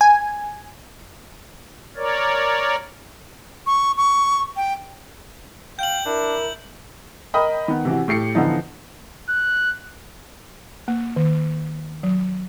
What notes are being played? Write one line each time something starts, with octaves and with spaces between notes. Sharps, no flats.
G#5
A#4 C#5 D5
C#6
C#6
G5
F5 G5 G6 F#7
D4 E4 A#4
A#4 D#5 G5 B5 D#6
D#3 B3
C3 E3 F#4
A2 G4 C7 C#7
D3 E3 F3 B3 D#4
F#6
A#3
D#3
F#3